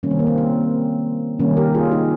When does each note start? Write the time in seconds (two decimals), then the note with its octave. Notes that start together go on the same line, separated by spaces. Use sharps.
0.03 C3 D#3 G3 A#3 C#4
0.11 C4
0.19 A#3
0.27 C4
0.38 C4
1.39 C3 D#3 G3 A#3 C#4
1.57 G4 A#4
1.75 F4 G#4
1.92 D#4 G4